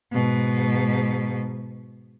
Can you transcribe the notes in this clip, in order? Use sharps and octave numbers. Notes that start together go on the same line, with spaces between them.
G#2 B2